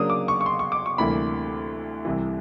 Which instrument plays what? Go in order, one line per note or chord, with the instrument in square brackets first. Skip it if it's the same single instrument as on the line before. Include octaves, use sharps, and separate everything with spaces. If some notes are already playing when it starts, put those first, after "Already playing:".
Already playing: [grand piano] C#3 F#3 A#3 D4 D#6
D6
C#6
C#6
C6
C#6
D6
C#6
D2 C3 E3 G3 A#3 B5
C2 C3 E3